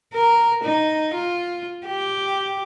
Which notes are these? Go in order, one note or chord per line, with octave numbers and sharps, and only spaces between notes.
A#4
D#4
F4
G4